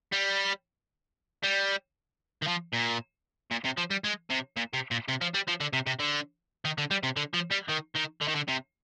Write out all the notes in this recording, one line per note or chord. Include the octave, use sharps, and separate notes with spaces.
G3
G3
D#3
F3
A#2
A#2
C3
F3
G3
G#3
C3
A#2
C3
A#2
C3
F3
G3
F3
D3
C3
C3
D3
D#3
D3
G3
C3
D3
F3
G3
D#3
D#3
D3
D#3
D3
C3